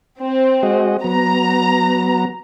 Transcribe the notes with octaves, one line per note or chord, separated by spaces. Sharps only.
C4
G#3 F#4 D#5
F#3 B3 A#5